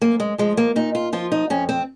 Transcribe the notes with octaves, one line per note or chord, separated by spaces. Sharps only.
F#2 A#3
G#3
F3 G#3
A#3
A#2 D#4
F4
F3 F4
D#4
F2 C#4
C4